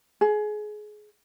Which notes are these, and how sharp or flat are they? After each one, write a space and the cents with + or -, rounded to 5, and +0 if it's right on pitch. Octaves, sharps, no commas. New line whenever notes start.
G#4 +25